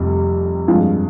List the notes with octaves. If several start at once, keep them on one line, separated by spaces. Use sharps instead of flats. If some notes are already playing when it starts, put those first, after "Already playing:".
Already playing: F1 F2 C3 G3
G2 F3 G#3 C4 F4